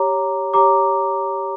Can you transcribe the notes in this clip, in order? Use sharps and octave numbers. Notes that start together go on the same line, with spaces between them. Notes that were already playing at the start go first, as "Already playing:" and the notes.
Already playing: G4 C#5 A#5 D6
G4 C#5 A#5 D6